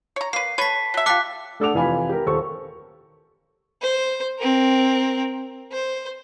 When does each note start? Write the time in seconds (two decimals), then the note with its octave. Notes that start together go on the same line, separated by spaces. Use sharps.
0.16 C#5 A#5
0.33 A#3 B4 C7
0.58 A4 B4 C#5 A5 B6
0.94 F#3 E5
1.06 F4 G4 A4 D6 F#6 B6
1.60 A3 D4 A4 F#5 D6 F7
1.74 F1 E3 F4 G#5 B5
2.09 G4 A#4
2.26 D#1 A4 C5 C#6
3.82 C5
4.39 C4 A#4
5.72 C5